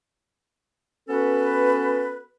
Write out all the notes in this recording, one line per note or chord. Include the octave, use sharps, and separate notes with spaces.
B3 C#4 F#4 A4 B4